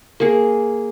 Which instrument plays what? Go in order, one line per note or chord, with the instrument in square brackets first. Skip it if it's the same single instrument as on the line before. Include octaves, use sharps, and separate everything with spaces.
[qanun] A#3 G#4